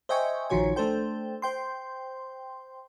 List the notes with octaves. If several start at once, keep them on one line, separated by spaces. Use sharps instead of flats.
C5 D#5 E5 G5 G#5 C#6
A#1 D#3 F3 F#4 C#5 G#5
A3 D4 A4 C5 G5
C5 G5 C6